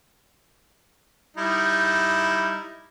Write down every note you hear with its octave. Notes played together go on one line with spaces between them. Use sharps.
G3 D#4 E4